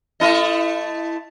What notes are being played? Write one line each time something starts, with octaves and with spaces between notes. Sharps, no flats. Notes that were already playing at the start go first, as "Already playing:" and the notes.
A3 E4 D#5